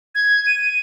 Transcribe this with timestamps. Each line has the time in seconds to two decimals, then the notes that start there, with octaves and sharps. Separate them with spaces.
0.15 G#6
0.47 D#7